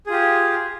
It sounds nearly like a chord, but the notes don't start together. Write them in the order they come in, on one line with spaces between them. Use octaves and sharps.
G#4 F4 G4